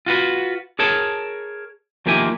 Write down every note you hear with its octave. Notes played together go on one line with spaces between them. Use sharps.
F4 F#4 B4
G#4 A#4 C#5 A5
D#2 F3 A#3 G4 E5 G#5